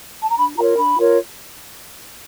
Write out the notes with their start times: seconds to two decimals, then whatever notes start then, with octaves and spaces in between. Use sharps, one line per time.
0.23 A5
0.30 A#5
0.37 D4 B5
0.57 F4 A#4 C#5 A#5
0.77 D4 B5
0.98 F4 A#4 C#5